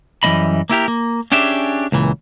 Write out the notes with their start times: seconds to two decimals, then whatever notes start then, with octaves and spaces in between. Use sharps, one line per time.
0.23 F#2 E3 G3 A#3 D#5 B5
0.69 A#3 E4 G4 A#4
0.88 A#3
1.32 C#4 D4 G4 G#4 E5
1.92 C#2 A#2 E3